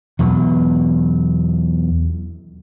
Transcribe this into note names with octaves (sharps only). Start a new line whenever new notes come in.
E2 B2 F#3